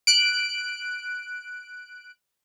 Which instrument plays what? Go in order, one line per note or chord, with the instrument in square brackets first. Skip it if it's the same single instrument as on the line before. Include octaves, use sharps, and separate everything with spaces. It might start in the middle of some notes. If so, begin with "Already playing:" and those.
[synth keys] F#6 D7